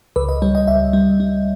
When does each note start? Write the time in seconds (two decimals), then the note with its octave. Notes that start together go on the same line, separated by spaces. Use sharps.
0.16 C#2 B4
0.29 D#5
0.42 G3 C#5
0.55 D#5
0.68 C#2 E5
0.93 G3
1.20 G3